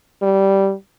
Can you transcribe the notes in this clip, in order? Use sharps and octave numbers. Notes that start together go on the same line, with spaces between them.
G3